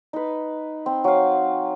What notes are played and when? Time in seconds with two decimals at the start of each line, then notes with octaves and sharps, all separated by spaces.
0.13 D#4 B4
0.86 C4
1.04 F#3 F5